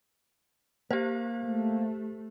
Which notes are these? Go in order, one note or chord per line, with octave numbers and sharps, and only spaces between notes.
A#3 G4 C5
A3